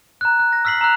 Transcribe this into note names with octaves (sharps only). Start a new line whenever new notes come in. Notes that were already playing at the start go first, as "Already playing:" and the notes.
A#5 F#6
F#6
A#6
E6 F6 B6 C7 F#7
A#5 E6 F#6 F7